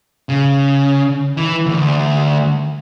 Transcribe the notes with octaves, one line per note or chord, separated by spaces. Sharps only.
C#3
E3
D2